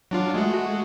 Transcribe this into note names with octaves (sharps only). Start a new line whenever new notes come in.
F#3 D4 F4
G#3 A3 F#4